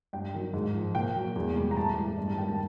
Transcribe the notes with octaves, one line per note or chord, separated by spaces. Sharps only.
G2 G5
D#3 F#3
G#2
F3
A#2 G5
F#3
E2
B2 G3
A#5
A2 A5
E3 G3
G2
A5
D#3 G3 G5
A5